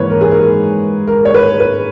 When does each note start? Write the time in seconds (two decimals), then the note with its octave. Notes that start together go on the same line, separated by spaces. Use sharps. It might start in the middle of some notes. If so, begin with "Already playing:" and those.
Already playing: G#2 E3 A#3 B4 C#5
0.10 A#4
0.21 G#4
0.31 A#4
1.08 A#4
1.25 C#5
1.34 B4
1.60 B4